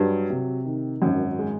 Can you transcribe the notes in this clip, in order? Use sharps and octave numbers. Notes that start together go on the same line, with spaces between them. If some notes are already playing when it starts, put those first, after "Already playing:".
Already playing: G2 F#3
C3
D#3
G#1 F#2
G#3